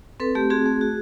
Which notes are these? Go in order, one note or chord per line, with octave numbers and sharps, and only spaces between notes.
C4 A4 B4
A3 G4
C4 F#4 G#4
A3
F#4